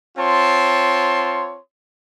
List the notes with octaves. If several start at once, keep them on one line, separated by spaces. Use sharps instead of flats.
C4 F4 C#5 A5 C6